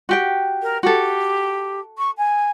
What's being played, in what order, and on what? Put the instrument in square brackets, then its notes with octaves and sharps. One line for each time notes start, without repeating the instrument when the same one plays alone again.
[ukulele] F#4 G4 G5
[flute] A#4
[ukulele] F#4 A4 [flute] G4
[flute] C#6
G#5